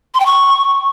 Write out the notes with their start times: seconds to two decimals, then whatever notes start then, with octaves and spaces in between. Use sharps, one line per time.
0.14 C6
0.20 G5
0.26 C#6